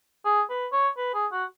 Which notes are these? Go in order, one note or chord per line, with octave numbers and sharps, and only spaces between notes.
G#4
B4
C#5
B4
G#4
F#4